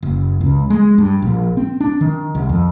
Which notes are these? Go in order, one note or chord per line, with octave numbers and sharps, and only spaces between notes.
F#1
C#2
G#3
G2
A#1
C4
D4
D#3
C2
F2